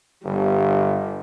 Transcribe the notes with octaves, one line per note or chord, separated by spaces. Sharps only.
G1 G3